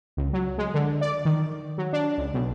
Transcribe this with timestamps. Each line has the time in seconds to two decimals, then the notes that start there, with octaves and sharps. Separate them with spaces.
0.17 C#2
0.33 F#3
0.58 G#3
0.74 D3
1.01 D5
1.25 D#3
1.78 F#3
1.93 D4
2.18 C#2
2.34 B1